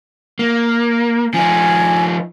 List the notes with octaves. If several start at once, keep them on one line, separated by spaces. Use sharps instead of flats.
A#3
F3 D#4 G#5